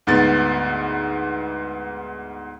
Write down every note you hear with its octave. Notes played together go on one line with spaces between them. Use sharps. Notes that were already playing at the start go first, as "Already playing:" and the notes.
D2 G#2 B3 A6